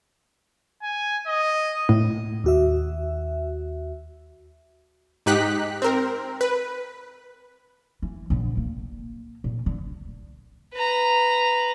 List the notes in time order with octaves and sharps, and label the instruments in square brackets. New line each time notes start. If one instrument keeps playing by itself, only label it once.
[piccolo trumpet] G#5
D#5
[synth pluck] A2
[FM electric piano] D#2 F#4 E5
[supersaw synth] G#2 D#4 G4 F#6 B6
C4 A#4
B4
[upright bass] E3
A#1 D3
A#3
A#2
D3
[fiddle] B4 A#5